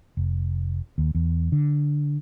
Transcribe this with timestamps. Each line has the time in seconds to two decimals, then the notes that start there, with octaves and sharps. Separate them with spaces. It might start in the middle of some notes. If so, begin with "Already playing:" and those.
0.17 F1
0.98 D#2
1.15 E2
1.52 D3